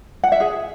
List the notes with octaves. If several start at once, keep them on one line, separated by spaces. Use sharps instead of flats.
F#5
E5
G#4